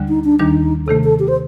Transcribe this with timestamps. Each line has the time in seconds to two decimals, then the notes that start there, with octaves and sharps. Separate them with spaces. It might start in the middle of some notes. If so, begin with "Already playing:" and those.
Already playing: D2 D3 G3
0.09 D#4
0.24 D4
0.39 D#2 D#3 G3 D4 D#4
0.87 C3 D#3 A3 A4
1.04 A4
1.20 G4
1.28 C5